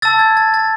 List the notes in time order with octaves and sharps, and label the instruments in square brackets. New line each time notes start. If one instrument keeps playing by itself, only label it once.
[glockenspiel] A5 E6 A6
G#6
A6
A6